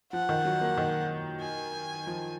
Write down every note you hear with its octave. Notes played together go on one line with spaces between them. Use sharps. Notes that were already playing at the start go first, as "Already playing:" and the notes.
F3 F#5
D#3
F#3
A#3
D#3
G#5
F3